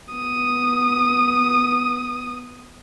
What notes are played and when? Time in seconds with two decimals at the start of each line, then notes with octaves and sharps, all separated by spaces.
0.13 B3 D#6